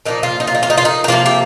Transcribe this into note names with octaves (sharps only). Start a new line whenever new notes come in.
A#2 F3 A#3 D#4
F4
D#4
F4
D#4
F4
D#4
F4
D#4
D#4
C3 F3 A#3 F4
G4